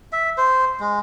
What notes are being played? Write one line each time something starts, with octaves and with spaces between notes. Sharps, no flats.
E5
C5
G#3